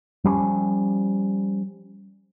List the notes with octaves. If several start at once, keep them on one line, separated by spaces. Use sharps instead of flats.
F3 G3 A#3 C#4